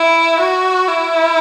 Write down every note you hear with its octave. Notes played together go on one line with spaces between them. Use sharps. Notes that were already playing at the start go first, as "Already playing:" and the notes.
Already playing: E4
F#4
E4